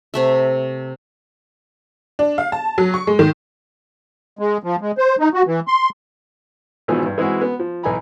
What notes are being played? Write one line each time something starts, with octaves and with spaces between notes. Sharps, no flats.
C3 A3 E5
D4
F5
A5
F#3
C#6
G#3
D#3
G#3
F3
G#3
C5
D#4
F#4
E3
C6
G#1 B2 E3 F3 G#5
G2
E3 G#3 C4 E4 F#4
B3
F3
B1 E3 D#4 G#5 A#5 B5